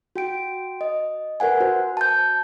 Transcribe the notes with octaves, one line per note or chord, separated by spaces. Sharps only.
F#4 G5 D7
D#5
A#4 B4 F#5 G#5
F#4 C5
A5 G6